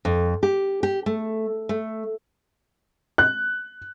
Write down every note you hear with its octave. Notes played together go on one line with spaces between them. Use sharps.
F2
G4
G4
A3
A3
F#6